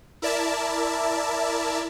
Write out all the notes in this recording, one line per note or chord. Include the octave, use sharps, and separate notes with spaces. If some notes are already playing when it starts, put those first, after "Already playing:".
E4 A#4 D5 E5 A5